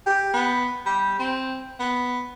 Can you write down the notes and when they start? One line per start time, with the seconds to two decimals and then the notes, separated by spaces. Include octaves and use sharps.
0.07 G4
0.34 B3
0.86 G3
1.19 C4
1.80 B3